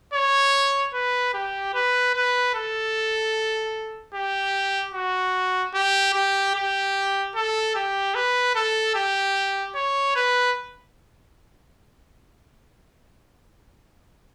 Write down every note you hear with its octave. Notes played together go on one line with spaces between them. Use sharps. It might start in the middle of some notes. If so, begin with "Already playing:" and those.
C#5
B4
G4
B4
B4
A4
G4
F#4
G4
G4
G4
A4
G4
B4
A4
G4
C#5
B4